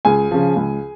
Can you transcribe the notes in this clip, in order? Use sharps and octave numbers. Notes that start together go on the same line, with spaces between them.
C#2 G#4 G#5
C#3 F3
C#2